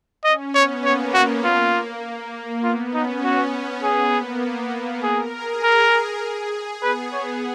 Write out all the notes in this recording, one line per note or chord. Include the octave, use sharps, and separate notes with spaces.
C#4 D#5
B3 C#5
A#3 C#5
F#4
F4
B3 F4
C#4 D#4
F#4
B3 G#4
A#3
G#4 A#4
G#4
A#4
G#4
B3 B4
C#5